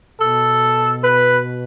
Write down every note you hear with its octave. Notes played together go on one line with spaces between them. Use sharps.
B2 A4
B4